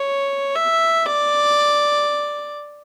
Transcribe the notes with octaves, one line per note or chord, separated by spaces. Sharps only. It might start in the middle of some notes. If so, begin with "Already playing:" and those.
Already playing: C#5
E5
D5